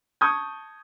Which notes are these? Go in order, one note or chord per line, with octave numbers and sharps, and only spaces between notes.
A5 C#6 D#6 G6 G#6